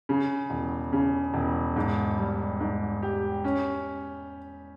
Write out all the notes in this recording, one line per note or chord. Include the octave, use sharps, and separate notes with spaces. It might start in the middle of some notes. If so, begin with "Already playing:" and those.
C#3
E1
C#3
E1
G#2
G3
G#2
G4
C#4